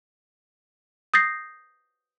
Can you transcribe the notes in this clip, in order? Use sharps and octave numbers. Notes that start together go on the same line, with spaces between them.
D#6 G6 A6 A#6 C7